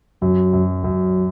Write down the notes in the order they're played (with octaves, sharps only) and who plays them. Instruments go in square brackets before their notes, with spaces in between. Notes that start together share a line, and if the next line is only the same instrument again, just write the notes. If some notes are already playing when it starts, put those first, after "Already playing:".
[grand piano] F#2 [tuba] F#3
[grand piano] F#2
[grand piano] F#2 [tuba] F#3